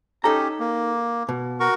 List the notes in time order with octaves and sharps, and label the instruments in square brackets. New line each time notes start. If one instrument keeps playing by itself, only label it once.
[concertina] C#4 G4 [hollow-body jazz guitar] D#4 A4 A#5
[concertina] A#3
[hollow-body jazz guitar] B2
[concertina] F#4 A#4 C#6